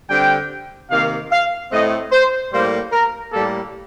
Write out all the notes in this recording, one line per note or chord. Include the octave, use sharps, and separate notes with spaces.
D3 G3 C4 G5
C3 D#3 A#3 F5
F5
A2 A3 C4 D#5
C5
A2 G3 A#3 C5
A#4
A2 G3 A#3 A4